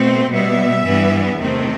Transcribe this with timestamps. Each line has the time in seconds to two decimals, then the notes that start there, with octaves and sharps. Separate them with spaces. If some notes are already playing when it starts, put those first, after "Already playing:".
Already playing: B2 A3 C4
0.31 B2 G3 B3 E5
0.85 G2 E3 B3
1.38 E2 C3 D#3 A3 C4